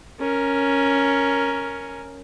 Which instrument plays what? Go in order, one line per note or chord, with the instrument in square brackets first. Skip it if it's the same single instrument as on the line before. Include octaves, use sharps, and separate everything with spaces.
[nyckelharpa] C#4 A#4